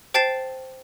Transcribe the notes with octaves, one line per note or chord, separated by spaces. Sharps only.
C5 G5 A5 A6 C7 E7